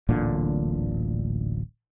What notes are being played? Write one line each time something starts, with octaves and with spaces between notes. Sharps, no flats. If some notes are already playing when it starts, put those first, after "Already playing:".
D1 A1 A#2 D3